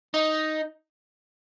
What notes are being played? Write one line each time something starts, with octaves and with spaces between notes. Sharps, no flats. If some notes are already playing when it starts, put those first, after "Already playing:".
D#4